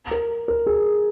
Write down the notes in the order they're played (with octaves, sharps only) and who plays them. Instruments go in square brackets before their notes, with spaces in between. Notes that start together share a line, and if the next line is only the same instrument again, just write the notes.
[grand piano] A#4
A#4
G#4